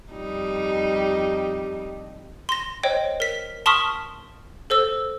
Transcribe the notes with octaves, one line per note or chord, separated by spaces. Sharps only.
F2 G3 D#4
C6 A#6
C5 C#5 D#5 G5
A#4 B6
A5 C6 C#6 D#6 F6 B6
A4 C5 E6